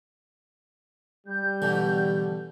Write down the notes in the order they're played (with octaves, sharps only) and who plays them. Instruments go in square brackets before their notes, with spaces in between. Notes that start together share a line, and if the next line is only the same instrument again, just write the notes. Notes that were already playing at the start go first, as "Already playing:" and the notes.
[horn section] G3 [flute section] G6
[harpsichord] B2 D3 E3